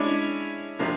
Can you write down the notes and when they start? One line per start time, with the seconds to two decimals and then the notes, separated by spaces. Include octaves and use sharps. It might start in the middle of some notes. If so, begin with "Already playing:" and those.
Already playing: G#3 C#4 D4 E4
0.79 C3 F3 A#3 D4